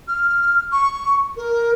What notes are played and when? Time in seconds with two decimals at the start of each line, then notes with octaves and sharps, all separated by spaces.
0.07 F6
0.72 C#6
1.36 A#4